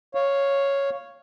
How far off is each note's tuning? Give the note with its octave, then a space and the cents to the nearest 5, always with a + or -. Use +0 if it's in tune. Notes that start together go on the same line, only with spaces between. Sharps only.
C#5 +0 F5 +0